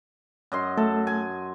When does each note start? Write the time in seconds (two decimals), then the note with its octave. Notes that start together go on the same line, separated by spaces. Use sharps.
0.52 F#2 D#5 C6
0.77 A3 A4
1.07 G#5